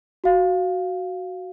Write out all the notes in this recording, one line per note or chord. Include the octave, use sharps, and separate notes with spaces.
F#4 F5